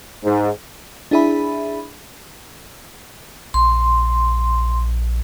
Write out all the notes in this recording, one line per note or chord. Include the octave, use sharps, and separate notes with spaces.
G#2
D4 E4 G#4 E5 B5
A#1 C6